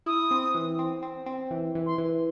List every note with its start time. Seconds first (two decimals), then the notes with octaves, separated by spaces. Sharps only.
0.06 E4 D#6
0.31 C4
0.54 E3
0.79 C4
1.02 C4
1.26 C4
1.51 E3
1.75 E3
1.86 C6
1.98 E3